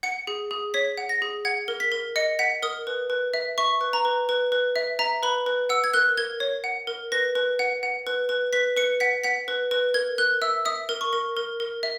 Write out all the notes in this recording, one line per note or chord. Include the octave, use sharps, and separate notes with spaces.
F#5 C#7
G#4
G#4
C#5 B6
F#5
A#6
G#4
F#5 G#6
A#4
B6
A#4
D#5 C#7
F#5 B6
A#4 D#6
B4
B4
E5
E5 C#6
B4
A#5
B4
B4
B4
E5
E5 A#5
B4 B5
B4
F#5 E6
G#6
A#4 F#6
A#4 G#6
C#5
F#5
A#4
B4 A#6
B4
F#5
F#5
B4
B4
B4 B6
B4 C#7
F#5 B6
F#5 B6
B4
B4
A#4 G#6
A#4 F#6
E5 E6
E5 D#6
A#4
C#6
A#4
A#4
A#4
E5